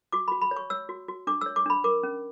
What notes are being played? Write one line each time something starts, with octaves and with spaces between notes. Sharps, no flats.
F#4 D6
F#4 B5
B5
C#5
C#6
C#5 E6
F#4
F#4
D4 D6
C#5 E6
D6
D4 B5
A#4 D6
C#4